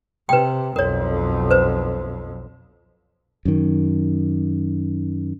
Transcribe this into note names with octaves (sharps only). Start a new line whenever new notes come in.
C3 B4 G5
B1 F2 A#4 C#5
B4 C5
F#2 D#3